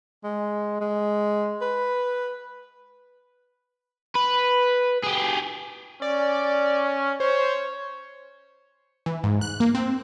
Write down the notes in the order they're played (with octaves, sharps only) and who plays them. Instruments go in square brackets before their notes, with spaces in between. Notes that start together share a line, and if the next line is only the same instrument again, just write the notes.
[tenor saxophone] G#3
G#3
B4
[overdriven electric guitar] B4
G4 G#4
[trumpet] C#4 [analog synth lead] D5
[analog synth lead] C5 [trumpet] C#5
[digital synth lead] E3
G#2
F#6
A#3
C4